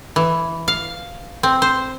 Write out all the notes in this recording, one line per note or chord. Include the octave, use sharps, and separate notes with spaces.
E3
F5
C4
C5